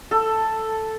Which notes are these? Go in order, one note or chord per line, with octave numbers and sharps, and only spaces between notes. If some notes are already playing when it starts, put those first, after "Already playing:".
A4